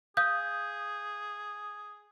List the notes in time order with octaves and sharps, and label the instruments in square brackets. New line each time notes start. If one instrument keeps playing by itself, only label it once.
[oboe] G#4 [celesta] F5 D#6 G6